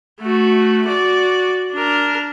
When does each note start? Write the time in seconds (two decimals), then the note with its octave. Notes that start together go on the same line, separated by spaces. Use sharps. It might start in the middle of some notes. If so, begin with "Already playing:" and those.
0.21 A3 F#4
0.86 F#4 D5
1.73 D4 A#4